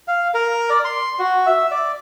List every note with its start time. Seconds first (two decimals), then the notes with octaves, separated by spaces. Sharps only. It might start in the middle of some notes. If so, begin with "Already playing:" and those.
0.08 F5
0.34 A#4
0.70 D5
0.85 C6
1.19 F#4
1.46 E5
1.71 D5